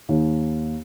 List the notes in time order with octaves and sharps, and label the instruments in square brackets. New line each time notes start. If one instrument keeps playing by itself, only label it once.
[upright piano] D#2